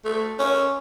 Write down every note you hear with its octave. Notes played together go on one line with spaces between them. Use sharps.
A3
C#4